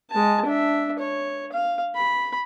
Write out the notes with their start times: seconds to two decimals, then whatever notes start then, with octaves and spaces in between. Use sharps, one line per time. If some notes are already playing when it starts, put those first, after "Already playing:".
0.11 G#3 A5
0.46 D4 E5
0.99 C#5
1.52 F5
1.95 B5